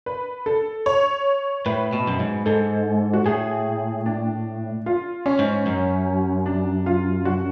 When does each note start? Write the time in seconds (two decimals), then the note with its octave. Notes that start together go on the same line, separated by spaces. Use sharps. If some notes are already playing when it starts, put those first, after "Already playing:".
0.06 B4
0.46 A4
0.86 C#5
1.66 A2 B4
1.93 B2
2.07 F#2
2.19 G#2
2.46 G#2 A4
3.14 F#4
3.26 A2 G#4
4.06 D4
4.86 F4
5.26 C#4
5.39 G#2
5.66 F#2
6.46 D4
6.86 F4
7.25 F#4